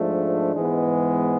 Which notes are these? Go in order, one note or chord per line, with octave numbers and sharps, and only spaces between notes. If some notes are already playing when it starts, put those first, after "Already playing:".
Already playing: G#2 F3 A3 D4
G#2 E3 G#3 B3